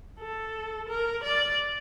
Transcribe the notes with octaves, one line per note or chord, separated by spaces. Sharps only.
A4
A#4
D5